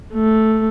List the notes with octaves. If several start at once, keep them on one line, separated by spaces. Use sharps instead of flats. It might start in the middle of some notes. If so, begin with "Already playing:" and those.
A3